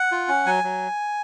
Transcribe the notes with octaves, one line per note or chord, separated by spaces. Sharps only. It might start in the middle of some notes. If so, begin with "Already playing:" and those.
Already playing: F#5
F4
C#4
F#3 G#5
F#3